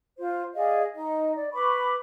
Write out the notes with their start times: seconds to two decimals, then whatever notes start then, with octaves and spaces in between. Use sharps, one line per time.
0.18 F4 C5
0.54 G#4 D5 D#5 F5
0.94 D#4 D#5
1.36 D5
1.53 B4 B5 C#6 D6